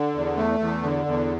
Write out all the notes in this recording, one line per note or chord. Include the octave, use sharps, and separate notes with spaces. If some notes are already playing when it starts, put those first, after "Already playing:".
Already playing: D3
E2
A3
E2
D3
E2